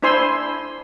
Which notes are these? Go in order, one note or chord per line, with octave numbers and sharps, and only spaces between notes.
D4 E4 C5 G#5 C6 E6